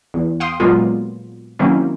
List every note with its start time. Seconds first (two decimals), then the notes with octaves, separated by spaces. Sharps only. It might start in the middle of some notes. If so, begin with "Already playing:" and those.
0.14 E2
0.40 F5 G5 C6 D#6
0.60 A#2 F#3 G#3 A#3 B3 F4
1.59 D#3 F#3 A#3 C4 C#4 E4